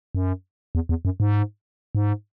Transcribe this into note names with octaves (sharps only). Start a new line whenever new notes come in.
F#2
E2
E2
F#2
G#2
G#2